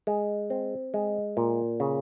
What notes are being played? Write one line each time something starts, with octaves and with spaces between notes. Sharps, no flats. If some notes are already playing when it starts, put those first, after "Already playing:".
G#3
C4
G#3
A#2
C#3